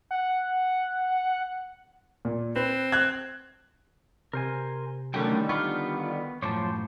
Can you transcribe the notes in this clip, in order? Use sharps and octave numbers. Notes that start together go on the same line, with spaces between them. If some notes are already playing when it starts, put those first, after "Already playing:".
F#5
A#2
C4 B4
F#6 G#6
C3 A#4 C5 G#5
D3 D#3 F#3 G3 A3 C#4 G5
B3 F4 B5 C#6 F6
F#2 A2 F3 C5 C#5 A5 D6